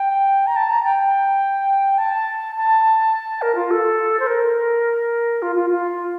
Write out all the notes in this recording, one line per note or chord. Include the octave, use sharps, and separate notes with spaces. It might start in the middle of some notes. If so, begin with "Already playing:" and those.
Already playing: G5
A#5
A5
A#5
G5
A5
A5
A#4
F4
A4
C5
A#4
F4
F4
F4